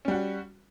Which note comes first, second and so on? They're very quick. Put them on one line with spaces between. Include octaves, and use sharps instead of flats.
C#4 G3 F#4